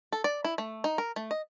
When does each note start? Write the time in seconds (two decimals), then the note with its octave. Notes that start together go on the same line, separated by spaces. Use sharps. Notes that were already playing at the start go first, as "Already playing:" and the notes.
0.13 A4
0.24 D5
0.44 E4
0.58 A3
0.84 D#4
0.98 A#4
1.16 A3
1.31 D#5